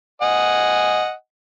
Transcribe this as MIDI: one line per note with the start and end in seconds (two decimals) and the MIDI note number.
0.22 1.12 75
0.22 1.12 78
0.22 1.12 80